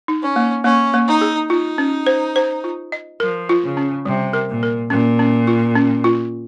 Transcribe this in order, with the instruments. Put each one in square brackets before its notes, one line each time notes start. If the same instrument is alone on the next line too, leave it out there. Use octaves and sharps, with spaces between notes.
[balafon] D#4
[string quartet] C#4
[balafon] A#3
[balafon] A#3 [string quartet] C#4
[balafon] A#3
[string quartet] D#4
[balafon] G#4
[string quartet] D#4 [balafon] F4
[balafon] C#4
C5
C5
F4
D#5
[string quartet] F3 [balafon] A#4
[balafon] F4
[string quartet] C#3
[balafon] C#4
[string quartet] C3 [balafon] G3
[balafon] A#4
[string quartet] A#2
[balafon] A#4
[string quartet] A#2 [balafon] C#4
[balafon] C#4
F4
C#4
F4